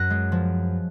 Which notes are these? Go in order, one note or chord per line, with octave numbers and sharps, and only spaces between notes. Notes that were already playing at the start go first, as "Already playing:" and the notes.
Already playing: F#2 F#6 A#6
G#3
F3